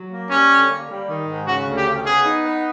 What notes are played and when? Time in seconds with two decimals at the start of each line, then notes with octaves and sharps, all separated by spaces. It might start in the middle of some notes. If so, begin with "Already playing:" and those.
Already playing: F#3
0.11 A#3
0.30 G3 C#4
0.50 D3
0.69 A#3
0.90 G3
1.09 D#3
1.28 G#2
1.47 C#3 F#4
1.67 D2
1.77 G4
1.86 C#3
2.06 B3 G#4
2.25 D#4
2.44 B3